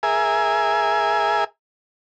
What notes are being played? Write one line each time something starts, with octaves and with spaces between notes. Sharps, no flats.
G#4 A#4 E5 G#5